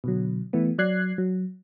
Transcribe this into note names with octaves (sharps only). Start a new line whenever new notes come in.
B2 D3 F#3
E3 A3 B3
F#3 D5 F#6 G#6 C7
F#3